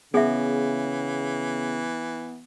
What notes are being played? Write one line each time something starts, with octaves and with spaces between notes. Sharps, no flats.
C#3 E3 B3 G#4 E5